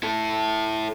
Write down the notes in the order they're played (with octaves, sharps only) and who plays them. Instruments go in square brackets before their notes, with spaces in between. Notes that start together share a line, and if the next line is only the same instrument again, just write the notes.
[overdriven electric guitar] E4 A4